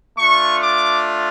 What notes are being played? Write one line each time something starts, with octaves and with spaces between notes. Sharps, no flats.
A3 D4 F4 C#6
D6